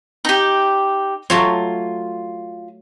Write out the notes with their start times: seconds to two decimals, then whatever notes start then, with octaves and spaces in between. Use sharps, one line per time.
0.25 D#4 G4
1.30 F#3 A3 F4 C#5